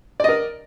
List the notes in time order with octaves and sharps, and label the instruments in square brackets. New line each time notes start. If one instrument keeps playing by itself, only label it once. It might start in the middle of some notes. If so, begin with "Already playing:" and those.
[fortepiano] D5
D#5
A#4